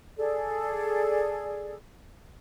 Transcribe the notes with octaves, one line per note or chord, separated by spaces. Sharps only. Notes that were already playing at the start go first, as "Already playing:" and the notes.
G#4 A4 D5